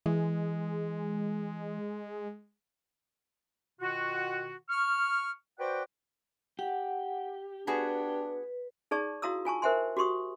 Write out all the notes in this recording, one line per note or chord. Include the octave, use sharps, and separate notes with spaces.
E3 G#3
B2 D#3 F4 F#4
C#6 F6
F#4 B4 C5 D5 F#5 G5
G4 F#5
B3 D4 F#4 G#4 B4
D#4 G#4 D5 A5 C#6
E4 F#4 F5 A#5 D#6 E6
F4 G#5 A5 C#6
A#4 C5 E5 F#5 G#5 C6
F#4 G4 C6 C#6 D#6